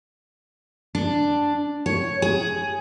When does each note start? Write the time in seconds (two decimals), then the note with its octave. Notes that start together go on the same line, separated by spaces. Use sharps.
0.95 D4
1.86 C#5
2.22 G#4